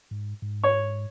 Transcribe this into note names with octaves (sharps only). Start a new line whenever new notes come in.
G#2
G#2
C#5